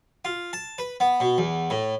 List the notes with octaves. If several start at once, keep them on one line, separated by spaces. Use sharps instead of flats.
F4
A5
B4
B3
B2
E2
A2